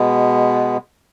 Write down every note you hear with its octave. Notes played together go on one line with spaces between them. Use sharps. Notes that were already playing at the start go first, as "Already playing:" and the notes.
Already playing: B2 G#3 B3